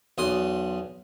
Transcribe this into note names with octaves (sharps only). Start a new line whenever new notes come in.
B1 E2 C6 D#6